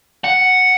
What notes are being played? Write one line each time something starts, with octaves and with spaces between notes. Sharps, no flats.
F#5